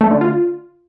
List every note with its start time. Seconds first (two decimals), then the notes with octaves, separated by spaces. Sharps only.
0.01 A3
0.11 D3
0.21 F4